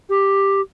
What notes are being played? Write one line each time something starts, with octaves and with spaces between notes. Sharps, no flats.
G4